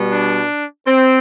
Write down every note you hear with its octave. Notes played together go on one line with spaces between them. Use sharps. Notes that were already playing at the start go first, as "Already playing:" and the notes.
Already playing: B2 G3
D4
C4